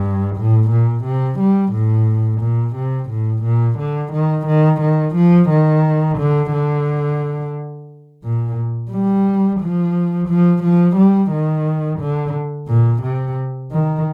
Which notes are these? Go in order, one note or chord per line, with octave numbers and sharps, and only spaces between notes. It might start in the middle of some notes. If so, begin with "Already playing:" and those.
Already playing: G2
A2
A#2
C3
G3
A2
A#2
C3
A2
A#2
D3
D#3
D#3
D#3
F3
D#3
D3
D3
A#2
G3
F3
F3
F3
G3
D#3
D3
A#2
C3
D#3